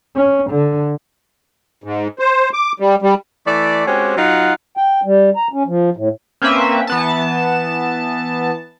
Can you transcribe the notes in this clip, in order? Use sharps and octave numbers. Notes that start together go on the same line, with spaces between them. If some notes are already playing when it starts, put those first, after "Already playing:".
C#4
D3
G#2
C5
D6
G3
G3
E3 A3 D5
G#3 C4 C#4 F#4 G4
F#3 D#4 F4 F#5
G5
G3
A#5
C#4
F3
A2
A#3 C4 C#4 B4 E5
E3 B3 A5